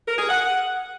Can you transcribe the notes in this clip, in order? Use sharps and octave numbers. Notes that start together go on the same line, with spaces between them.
A#4
G#4
F#5